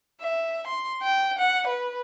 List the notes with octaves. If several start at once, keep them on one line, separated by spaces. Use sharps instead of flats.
E5
C6
G5
F#5
B4